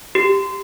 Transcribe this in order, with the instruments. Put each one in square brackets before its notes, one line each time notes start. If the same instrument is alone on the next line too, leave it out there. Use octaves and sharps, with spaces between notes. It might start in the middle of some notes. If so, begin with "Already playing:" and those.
[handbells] G4